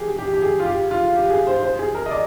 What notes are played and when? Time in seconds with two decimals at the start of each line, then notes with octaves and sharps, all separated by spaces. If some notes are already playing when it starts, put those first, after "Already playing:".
Already playing: G4 G#4
0.19 G4
0.34 G4
0.42 G#4
0.60 F4
0.66 G4
0.91 F4
1.15 G4
1.30 G#4
1.47 C5
1.62 C5
1.79 G#4
1.95 A#4
2.06 D#5
2.10 D5